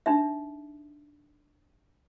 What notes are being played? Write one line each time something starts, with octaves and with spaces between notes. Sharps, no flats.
D4 D#4 E5